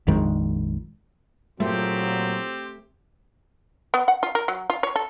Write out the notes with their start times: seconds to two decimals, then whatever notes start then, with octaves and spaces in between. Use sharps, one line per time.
0.07 A#1 F2 D#3 G#3
1.60 A#2 F#3 A3 C4 G4
3.94 B3
4.08 F#5
4.23 F4
4.35 A#4
4.48 F#3
4.70 F4
4.83 C#5
4.96 A4